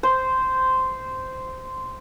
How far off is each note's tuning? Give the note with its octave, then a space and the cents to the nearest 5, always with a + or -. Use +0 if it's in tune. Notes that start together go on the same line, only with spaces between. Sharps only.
C5 -10